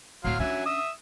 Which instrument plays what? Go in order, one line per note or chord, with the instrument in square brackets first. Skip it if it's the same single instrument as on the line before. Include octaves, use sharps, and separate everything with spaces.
[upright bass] D1 C4 [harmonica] F#3 F5 C6
[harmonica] F#3 E5 G#5 [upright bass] C#4 D4
[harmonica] E5 D#6 E6